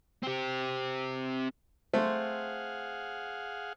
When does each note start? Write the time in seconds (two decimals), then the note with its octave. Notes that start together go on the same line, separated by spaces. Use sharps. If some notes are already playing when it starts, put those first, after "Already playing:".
0.23 C4 G4
1.94 A3 G#4 C5 F5 F#5